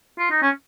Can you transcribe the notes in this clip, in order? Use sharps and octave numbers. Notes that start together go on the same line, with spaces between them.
F4
D#4
C#4